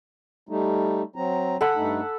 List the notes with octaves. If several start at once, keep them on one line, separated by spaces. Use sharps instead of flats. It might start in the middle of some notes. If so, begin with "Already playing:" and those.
G3 A3 D#4
F#3 C4 A#5
A4 F#5 B5
G2 A3 D#4